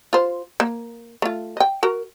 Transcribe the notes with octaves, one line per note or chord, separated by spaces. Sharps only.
F4 C5
A#3
A3 F4
D#5 G5
F#4 A#4